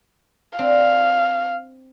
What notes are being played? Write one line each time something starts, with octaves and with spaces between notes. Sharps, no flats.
C4 D4 F5